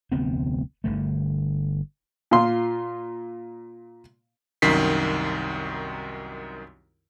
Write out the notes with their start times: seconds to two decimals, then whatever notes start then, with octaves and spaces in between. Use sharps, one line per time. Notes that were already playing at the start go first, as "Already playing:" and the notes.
0.12 F1 D2 B3 C4
0.84 G1 D3 A3
2.31 A#2 F4 C6
4.62 C2 F#2 D#3 B6 C7